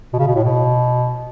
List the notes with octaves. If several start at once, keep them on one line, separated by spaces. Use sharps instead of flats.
B2
C#3
B2
A2
B2